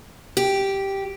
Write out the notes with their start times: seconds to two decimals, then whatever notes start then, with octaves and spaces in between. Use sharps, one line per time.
0.37 G4